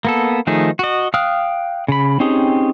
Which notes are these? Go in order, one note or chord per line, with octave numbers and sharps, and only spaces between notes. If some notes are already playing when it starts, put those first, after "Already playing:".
A#3 B3 A4
D#3 F3 A3 D#4 G#4
F#4 D#5
F5 G5 D#6 F6 F#6
C#3 B5
C4 C#4 D#4 G4 G#4